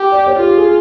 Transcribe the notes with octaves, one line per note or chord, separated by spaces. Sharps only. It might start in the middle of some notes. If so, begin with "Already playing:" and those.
Already playing: G4
D5
C#5
F4 G4
G#4